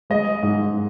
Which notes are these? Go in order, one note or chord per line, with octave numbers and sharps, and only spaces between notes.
G#3 D#5
G#2